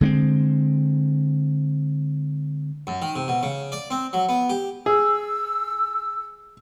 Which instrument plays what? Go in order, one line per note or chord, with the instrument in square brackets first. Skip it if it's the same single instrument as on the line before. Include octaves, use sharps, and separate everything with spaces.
[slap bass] D3 G#3 A#3 C4
[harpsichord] F#2
D#3
C3
B2
C#3
D5
C4
F#3
B3
G4
[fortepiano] G#4 [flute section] E6